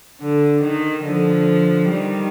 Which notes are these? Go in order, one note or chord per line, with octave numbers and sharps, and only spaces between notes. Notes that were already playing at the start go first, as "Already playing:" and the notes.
D3
D#3
D3 F3
D#3 G3